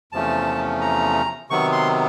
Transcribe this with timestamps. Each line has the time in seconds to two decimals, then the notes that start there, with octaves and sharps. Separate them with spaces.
0.12 E2 C3 F3 A3 C#4 A5
0.81 A#5
1.50 C3 D#3 F#3 B3 C#6
1.72 C6